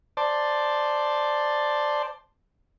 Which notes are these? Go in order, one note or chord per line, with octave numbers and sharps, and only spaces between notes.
C5 D5 A5